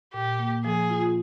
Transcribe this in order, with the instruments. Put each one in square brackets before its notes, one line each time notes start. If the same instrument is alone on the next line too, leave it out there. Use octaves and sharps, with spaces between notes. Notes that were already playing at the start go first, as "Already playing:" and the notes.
[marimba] A#2 [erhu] G4
[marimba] A#3
[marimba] F3 [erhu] G#4
[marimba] F4